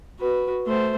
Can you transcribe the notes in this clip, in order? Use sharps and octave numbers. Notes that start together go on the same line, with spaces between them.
F#4 B4
A3 C5